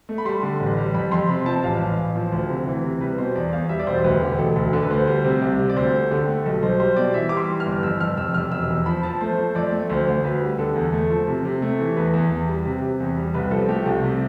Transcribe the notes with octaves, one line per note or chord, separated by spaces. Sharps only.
A3
B5
G3 C6
D3
A1
G3
F2 B5
F2 C6
C3 B5
F3 A5
A1 F5
A1
A1
F3
D2
C3
E3
C3
G3 B4
B2 C5
E2 D5
E2 F5
G3 E5
D5
E1 C5
C5
D2 B4
E1 G4
E1 A4
D2 A4
D3
B4
D2 C5
G3 C5
C3
C2
C3
D5
D2 C5
A3
D3 G4
A3
B1 A4
B1 C5
G3 C5
B2 D5
E3 E5
G3 D6
C6
E3
F6
G1
F2 E6
F2 F6
F1 E6
F1 F6
E1 E6
E2
F3 B5
F3 A5
A3 C5
F3
F2 D5
A3
D2 C5
D2
D2 B4
G3
D3 A4
E2
A3
F3
C3
C3
A3
E3
E2 B4
E2
E2
G3
C3
C3
E2
G3
C2 B4
F3 A4
A3 G4
C2 F4
C3